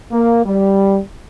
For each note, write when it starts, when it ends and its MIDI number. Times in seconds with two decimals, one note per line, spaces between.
0.11 0.42 58
0.46 0.99 55